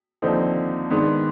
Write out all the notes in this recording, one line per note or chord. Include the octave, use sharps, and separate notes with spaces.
D#2 D3 F3 C4 D#4
G#2 D#3 B3 D4